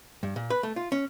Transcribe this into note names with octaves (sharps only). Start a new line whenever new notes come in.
G2
A#2
B4
A3
F4
C#4